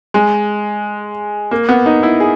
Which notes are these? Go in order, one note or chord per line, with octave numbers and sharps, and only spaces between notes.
G#3
A#3
B3
D#4
E4
G#4